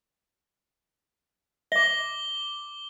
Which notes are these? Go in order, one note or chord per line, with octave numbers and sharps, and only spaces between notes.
E5 D6 G7